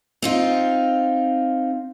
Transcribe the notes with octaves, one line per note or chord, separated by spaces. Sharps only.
C4 D#4 F4